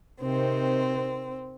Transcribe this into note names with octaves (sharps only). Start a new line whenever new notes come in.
C3 D#3 C4